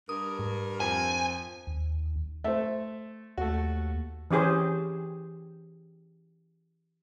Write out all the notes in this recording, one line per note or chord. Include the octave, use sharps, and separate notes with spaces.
G2 A#4 D#6
G#2
F2 C4 G#5
D#2
A3 C5 E5
D#2 A3 F#4
E3 C#4 G4 G#4 C5